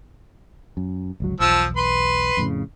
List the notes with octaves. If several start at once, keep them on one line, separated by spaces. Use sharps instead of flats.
F#2
G1 C#2 F#3
B1 E2 F3 E6
B4 C6
F2 A2 C#3